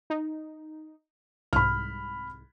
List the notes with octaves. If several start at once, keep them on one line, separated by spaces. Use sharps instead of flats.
D#4
C2 G#2 B5 F6